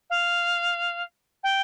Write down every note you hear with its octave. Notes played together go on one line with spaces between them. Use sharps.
F5
G5